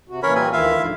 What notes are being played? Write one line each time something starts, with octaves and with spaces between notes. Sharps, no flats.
C3 F#4
A#2 E3 C#4 A#4 C#5 B5
G3 C4 A#4 G#5
D2 D#3 E3 E4 F4 E5 F5
G#2 D3 F3